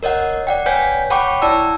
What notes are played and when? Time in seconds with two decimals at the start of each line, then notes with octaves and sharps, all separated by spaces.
0.03 A#4 C#5 D#5 F#5
0.47 D5 F#5 G5
0.66 B4 C#5 F#5 G#5 G6 B6
1.10 C#5 F#5 G5 B5 C#6 D6
1.42 E4 D5 A5 E6